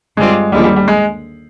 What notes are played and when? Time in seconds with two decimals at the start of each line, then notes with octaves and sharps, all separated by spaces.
0.17 G2 D3 G3 G#3 C4 F4
0.52 D#2 D3 G3 G#3
0.59 F3
0.64 G3
0.76 G3
0.88 G#3